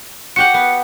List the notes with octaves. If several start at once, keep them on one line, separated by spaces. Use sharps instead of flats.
F#4 G4 F#5 C#7
B3